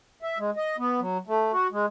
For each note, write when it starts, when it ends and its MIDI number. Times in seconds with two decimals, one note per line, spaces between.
0.22 0.38 76
0.38 0.50 56
0.56 0.76 75
0.78 1.00 59
1.00 1.18 54
1.27 1.52 57
1.53 1.67 66
1.72 1.86 56